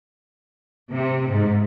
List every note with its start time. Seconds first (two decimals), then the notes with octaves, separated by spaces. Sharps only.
0.93 C3
1.30 G#2